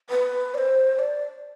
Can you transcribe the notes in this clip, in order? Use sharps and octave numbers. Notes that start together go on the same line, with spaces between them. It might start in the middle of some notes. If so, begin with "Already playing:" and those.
B4
D5
C5
D5